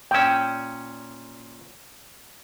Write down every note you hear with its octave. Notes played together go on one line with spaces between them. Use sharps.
A#2 C#4 G5 E6